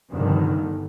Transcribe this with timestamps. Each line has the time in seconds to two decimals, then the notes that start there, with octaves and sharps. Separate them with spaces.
0.11 F1 G2 D3 D#3
0.51 G1